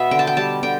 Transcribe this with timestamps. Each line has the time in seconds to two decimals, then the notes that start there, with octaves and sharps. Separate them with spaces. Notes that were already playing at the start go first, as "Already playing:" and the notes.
Already playing: B2 B3 E5
0.11 D3 G5
0.19 A5
0.27 G5
0.37 G3 A5
0.63 D3 G5